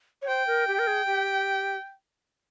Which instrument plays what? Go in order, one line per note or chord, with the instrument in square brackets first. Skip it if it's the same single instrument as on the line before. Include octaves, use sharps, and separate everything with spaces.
[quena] C#5
[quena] C5 [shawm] G5
[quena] A#4
G4
A#4
G#4
G4